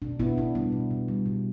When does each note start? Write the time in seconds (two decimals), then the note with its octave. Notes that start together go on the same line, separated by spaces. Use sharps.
0.02 B2 D4
0.20 B2 B3 E4
0.37 B2 D4
0.55 G3 B3
0.72 B2
0.91 B2
1.08 G3
1.26 B2